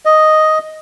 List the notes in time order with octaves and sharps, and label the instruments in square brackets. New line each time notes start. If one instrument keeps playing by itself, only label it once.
[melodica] D#5